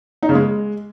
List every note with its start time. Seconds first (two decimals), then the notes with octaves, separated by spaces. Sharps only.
0.23 D#4
0.29 C#3
0.35 G#3